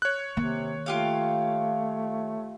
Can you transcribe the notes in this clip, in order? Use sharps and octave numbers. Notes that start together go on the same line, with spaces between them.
C#5 F#6
C3 D#3 A#3
A3 F4 G4 F5